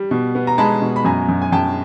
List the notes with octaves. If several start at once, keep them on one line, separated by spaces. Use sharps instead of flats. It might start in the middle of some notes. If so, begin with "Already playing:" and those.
Already playing: G3
B2
B3
A#5
G#3 A5 B5
B2
B5
F#2 G#5 A#5
F#2
G#5
F#2 G5 A5